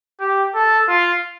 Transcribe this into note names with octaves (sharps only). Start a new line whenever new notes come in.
G4
A4
F4